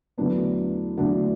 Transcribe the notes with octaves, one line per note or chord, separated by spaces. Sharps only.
E2 D3 F#3 A3 B3 D4
E2 D3 F#3 A3 D4 F#4